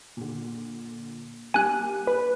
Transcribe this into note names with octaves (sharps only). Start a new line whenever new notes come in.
A#2 D3
G3 A#3 G4 G#5 F#6
B4